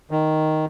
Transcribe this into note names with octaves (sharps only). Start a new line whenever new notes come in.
D#3